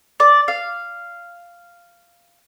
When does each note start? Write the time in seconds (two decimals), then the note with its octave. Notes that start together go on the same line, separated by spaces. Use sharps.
0.20 D5
0.48 F5